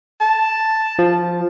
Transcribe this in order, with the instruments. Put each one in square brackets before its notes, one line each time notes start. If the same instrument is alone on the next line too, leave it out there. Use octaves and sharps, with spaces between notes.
[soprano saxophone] A5
[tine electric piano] F3